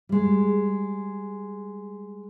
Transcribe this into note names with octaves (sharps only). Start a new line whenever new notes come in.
G3 G#3